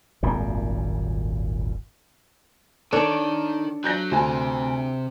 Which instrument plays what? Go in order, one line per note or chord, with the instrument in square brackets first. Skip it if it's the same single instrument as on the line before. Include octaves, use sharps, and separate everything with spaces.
[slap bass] D#1 G#1 F#2 A#2
[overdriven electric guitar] D#3 [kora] D4 C#5 [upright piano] A4
[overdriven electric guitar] F#3 [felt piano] F#6 G6 A#6
[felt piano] D2 G#5 [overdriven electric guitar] C3 C5